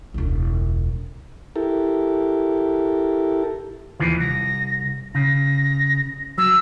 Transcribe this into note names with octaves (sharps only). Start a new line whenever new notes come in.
E1 C#2
E4 G4 A4 A#4
D#2 E3 F3
C2 A#6
C#3 A#6
F#3 E6